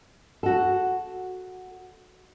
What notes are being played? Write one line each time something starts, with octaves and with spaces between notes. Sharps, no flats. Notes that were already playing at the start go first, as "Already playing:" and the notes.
F#4 A4